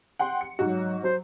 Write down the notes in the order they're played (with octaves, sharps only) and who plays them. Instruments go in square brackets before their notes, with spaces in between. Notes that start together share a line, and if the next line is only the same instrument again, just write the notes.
[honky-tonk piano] F#5 G5 C6
C#7
[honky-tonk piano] G#2 F#4 [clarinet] F#3
[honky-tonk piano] F#3 [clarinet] C5